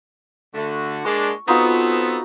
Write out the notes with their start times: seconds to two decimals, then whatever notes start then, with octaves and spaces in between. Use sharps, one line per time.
0.55 D3 A3 F#4
1.05 G#3 A#3 D4 C#6
1.48 B3 C4 D#4 F4 F#4 A4